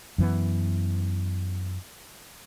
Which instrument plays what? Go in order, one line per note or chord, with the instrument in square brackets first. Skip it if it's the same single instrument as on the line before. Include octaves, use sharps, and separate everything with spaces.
[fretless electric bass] F#2 E3 B3